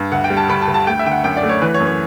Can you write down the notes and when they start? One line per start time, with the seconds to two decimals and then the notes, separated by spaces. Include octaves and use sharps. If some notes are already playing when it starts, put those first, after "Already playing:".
Already playing: G2
0.12 D2 F#5
0.24 G5
0.30 G3
0.37 A5
0.49 D2 B5
0.62 A5
0.68 D2
0.74 A5
0.87 A3 G5
0.99 E5
1.06 D3 G5
1.12 F#5
1.24 F#2 G5
1.37 D5
1.43 A3
1.49 C#5
1.62 E3 B4
1.74 C#5
1.80 F#2
1.87 C#5